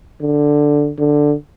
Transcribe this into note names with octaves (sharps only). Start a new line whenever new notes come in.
D3
D3